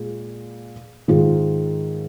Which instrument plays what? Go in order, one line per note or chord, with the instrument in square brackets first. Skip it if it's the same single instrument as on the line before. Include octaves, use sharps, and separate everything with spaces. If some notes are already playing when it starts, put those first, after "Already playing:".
Already playing: [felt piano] A#2 G#3
G#2 D#3 G#3 F4